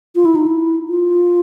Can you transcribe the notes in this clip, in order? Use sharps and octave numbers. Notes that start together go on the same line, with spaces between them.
F4
E4
D#4
E4
F4